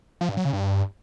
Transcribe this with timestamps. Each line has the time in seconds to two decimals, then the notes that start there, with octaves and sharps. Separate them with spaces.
0.21 F3
0.29 G2
0.37 F#3
0.45 C#3
0.53 G2